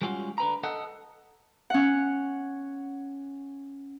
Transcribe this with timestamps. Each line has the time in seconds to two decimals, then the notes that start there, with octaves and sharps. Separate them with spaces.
0.02 G3 G#3 C#4 F4 F#4
0.38 D3 B4 A#5
0.63 A4 D#5 F#5
1.70 C#4 F#5